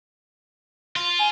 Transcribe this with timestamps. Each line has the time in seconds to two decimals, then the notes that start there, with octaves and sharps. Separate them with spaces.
0.96 F4
1.19 G#5